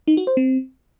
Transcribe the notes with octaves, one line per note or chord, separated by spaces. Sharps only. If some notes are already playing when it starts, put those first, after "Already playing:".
D#4
F#4
C5
C4